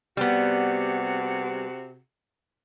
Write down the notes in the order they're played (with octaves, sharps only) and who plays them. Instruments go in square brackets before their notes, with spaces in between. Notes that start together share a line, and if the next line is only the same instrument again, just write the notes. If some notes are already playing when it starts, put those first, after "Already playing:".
[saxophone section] C3 F#4 G#4 [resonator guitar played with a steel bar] G3 B3